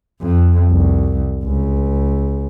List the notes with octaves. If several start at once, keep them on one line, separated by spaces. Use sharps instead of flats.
F2
C2
C#2